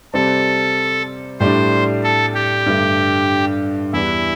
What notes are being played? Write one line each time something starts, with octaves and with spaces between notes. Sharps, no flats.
C3 G3 C4 A4
A2 G3 D4 C5
A4
G4
G2 D3 A3
E2 E3 G3 E4